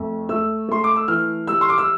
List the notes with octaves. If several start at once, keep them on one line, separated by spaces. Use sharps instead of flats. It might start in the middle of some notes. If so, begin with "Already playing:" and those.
Already playing: F2 A3
A3 E6
A3 C6
D6
E6
E3 F6
G3 E6
C6
D6
E6